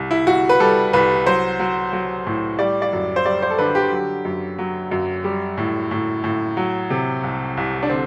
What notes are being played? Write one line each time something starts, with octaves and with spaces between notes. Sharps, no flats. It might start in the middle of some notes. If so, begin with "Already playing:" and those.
Already playing: C2
E4
C2 F#4
B4
G3 A4
C2 B4
F#3 C5
F#3
F#3
A2
G3 D5
D5
F#2
C5
G3 D5
C5
A4
D3 B4
G4
F#3
F#2
F#3
F#2
G3
A2
A2
A2
F#3
C3
C2
C2
D4
D3 C4